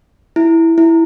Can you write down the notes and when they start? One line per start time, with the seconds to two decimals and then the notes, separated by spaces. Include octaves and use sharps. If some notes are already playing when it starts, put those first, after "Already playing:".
0.36 E4
0.78 E4